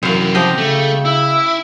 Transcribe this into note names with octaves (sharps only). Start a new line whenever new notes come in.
F#2 C3 E3 F5
F3 G4 D#5 F5
C#3 A3
E4 E6